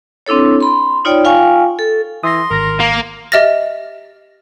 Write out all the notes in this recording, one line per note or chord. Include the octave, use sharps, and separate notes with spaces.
C4 D4 E4 A4 C#5
B5 C6
D#4 F4 C#5 D5 G5
F4 F5 G5 G#5 C#6
A4
E3 C6 D#6 A#6
G#1 A#4 A#6
A#3
G4 D#5 E5 F6 A6 A#6